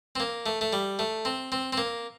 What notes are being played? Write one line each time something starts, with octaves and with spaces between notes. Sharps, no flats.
C4
A#3
A3
A3
G3
A3
C4
C4
C4
A#3